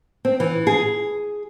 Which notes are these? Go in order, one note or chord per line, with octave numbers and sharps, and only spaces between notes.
C4
E3
G#4